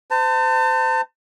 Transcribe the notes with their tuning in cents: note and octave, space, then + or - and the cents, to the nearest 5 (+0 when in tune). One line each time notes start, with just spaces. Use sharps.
C5 -35 A5 +35